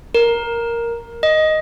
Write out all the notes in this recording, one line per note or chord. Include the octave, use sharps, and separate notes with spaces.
A#4
D#5